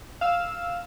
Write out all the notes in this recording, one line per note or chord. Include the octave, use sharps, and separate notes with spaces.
F5 E6